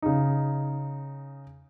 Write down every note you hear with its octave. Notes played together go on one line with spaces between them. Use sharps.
C#3 D#4